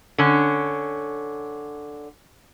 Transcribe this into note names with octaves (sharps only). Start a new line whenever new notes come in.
D3 C#4